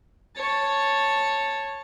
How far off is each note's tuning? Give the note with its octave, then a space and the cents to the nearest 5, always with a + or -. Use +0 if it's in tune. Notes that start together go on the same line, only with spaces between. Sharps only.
C#5 -5 A5 +0